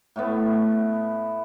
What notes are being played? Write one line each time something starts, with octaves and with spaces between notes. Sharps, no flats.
A2 A3 B3